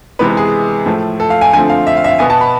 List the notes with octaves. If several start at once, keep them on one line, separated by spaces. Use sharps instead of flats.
C3 E3 G#3 B3 B4
G#4
A2 F3 A3
A4
F5
G#5
D3 F3 A3 C4 G#5
F5
E5
F5
E5
F5
B2 B3 G#5
A5
B5